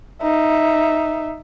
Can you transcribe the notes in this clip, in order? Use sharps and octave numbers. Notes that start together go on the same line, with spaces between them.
D#4 E5